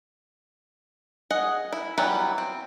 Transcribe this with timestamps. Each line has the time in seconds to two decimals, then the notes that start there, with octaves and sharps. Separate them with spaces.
1.30 G#4 D#5 F#5
1.72 E4
1.98 E3 F#3 G3 B3
2.38 C4